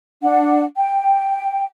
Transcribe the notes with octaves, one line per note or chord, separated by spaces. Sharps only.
D4 F#5
G5